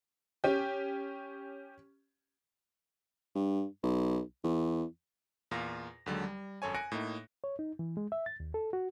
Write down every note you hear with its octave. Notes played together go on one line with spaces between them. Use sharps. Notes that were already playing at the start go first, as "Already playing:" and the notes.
C#4 G4
G2
B1
E2
E2 A#2 F4 A#6
D#2 D3 F#3 G#3
G3
G#1 F#2 A4 C#5 G#5
G#5 F#6 A#6 C#7 D7
A2 A#3 D#4
C#5
D#4
E3
G#3
E5
A6
D#2
A4
F#4